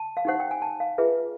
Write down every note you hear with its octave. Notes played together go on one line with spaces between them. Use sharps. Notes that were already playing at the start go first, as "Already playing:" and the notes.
Already playing: A5
F5
D#4 G4 C5 F#5
G5
G#5
A5
F5
F4 G#4 B4 E5